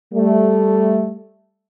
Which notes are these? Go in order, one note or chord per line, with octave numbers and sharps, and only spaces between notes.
G3 A3